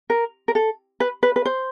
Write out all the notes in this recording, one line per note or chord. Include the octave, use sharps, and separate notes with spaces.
A#4
A#4
A4
B4
B4
B4
C5